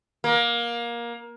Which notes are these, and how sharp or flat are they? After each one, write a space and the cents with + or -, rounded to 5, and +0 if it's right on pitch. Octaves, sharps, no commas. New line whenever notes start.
A#3 +20